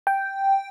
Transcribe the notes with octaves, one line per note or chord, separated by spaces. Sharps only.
G5